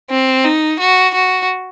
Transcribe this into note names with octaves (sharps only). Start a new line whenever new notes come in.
C4
D#4
F#4
F#4